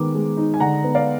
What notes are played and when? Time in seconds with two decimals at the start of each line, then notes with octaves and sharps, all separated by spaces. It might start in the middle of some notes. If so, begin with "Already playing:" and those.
Already playing: D#3 G#3 B3 D6
0.15 G#3
0.37 D#4
0.54 G#5
0.60 D3 F#5 A#5
0.84 B3
0.95 D5 F5